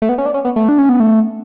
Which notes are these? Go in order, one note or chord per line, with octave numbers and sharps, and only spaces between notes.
A3
B3
C#4
D4
C#4
B3
A3
D4
C#4
B3
A3